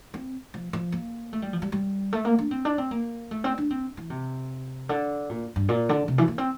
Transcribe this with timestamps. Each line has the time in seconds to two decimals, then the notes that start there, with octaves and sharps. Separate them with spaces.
0.14 C4
0.54 F3
0.73 F3
0.92 A#3
1.33 A3
1.42 G3
1.53 F3
1.62 G3
1.72 G3
2.13 A3
2.25 A#3
2.38 D4
2.51 C4
2.65 D4
2.78 C4
2.91 A#3
3.31 A3
3.44 C4
3.58 D4
3.71 C4
3.97 E3
4.10 C3
4.89 D3
5.29 A#2
5.56 G2
5.69 A#2
5.89 D3
6.08 C3
6.18 E3
6.28 A#3
6.38 C4